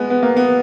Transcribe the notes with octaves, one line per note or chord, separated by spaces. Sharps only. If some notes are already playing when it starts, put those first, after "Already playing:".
Already playing: G#3 B3
B3
A#3
B3